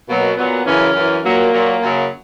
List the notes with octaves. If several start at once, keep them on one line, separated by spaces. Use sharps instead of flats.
B2 F#3 A#3
A#2 F#3 B3
F#2 C#3 E3 C#4
F#2 E3
A#2 F#3 A#3
A#2 F#3
F#2 C#3 F#3